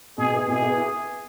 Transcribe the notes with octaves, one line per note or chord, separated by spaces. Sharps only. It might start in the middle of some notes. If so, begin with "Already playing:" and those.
B2 G#4
B3 E4
B2 G#4
B3 E4